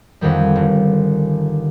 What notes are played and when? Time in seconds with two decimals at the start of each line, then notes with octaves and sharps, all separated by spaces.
0.21 F2 D3 D#3 G3
0.56 G1